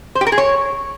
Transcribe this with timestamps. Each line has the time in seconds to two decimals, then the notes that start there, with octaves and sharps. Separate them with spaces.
0.15 C5
0.21 G4
0.27 A#4
0.32 G#4
0.38 C#5